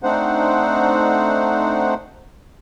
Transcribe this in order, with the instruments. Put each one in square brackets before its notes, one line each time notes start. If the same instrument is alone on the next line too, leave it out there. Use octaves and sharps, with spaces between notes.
[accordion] A3 C4 D4 D#4 C5 F#5